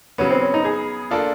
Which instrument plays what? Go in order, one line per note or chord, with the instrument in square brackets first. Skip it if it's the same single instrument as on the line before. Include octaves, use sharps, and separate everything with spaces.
[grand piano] C#3 F#3 B3 [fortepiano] C#4
[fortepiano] C4
C#4
D#4
G#4
[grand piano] A#3 D4 F4 A4